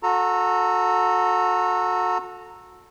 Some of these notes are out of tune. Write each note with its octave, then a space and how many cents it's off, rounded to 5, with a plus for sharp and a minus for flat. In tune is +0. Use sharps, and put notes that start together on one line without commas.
F#4 -30 A4 +0 A#5 -15